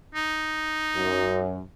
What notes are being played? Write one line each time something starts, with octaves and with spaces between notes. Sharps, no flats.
D#4
F#2